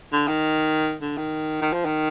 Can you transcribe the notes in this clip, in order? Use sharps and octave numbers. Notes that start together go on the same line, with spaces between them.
D3
D#3
D3
D#3
D#3
F3
D#3